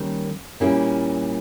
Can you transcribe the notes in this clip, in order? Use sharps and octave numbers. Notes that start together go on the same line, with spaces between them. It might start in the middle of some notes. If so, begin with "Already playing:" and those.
Already playing: D#3 G3 A#3 C#4
A#2 G3 A#3 C#4 E4